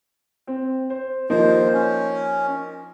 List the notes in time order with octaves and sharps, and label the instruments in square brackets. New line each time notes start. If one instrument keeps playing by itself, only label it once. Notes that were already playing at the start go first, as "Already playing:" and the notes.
[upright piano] C4
C5
[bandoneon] D#2 C5 [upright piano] F3 A#3 D#4
[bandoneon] C#4